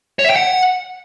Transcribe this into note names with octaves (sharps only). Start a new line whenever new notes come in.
C#5
E5
G5
F#5